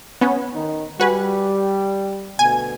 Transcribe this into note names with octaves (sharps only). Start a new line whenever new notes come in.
B3 C#4
D#3 D#4
G3 F#4 B4 G#5
D2 B2 G#5